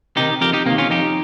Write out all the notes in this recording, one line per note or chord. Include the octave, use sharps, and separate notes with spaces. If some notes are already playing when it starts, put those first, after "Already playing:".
C3 D#3 D#4 G4
F2 G4 A#4
D#4 G4
C3 D#3 A#3
C#4 F4
F2 D#4 G4